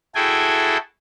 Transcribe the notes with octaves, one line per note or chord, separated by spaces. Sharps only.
E4 F#4 G#4 A4 G5 G#5